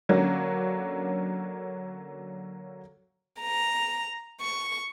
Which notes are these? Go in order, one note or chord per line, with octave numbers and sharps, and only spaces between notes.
D3 F#3 A#3 C#4 D4
A#5
C#6